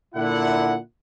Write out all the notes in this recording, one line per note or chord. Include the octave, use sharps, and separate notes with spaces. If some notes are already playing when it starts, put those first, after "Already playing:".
A#2 D3 E4 F#5